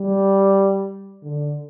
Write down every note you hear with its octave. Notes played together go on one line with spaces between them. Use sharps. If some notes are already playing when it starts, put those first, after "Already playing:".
Already playing: G3
D3